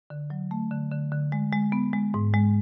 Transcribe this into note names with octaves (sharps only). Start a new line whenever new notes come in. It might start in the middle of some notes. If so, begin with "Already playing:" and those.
D3
F#3
A3
D3
D3
D3
G#3
G#3
B3
G#3
G#2
G#3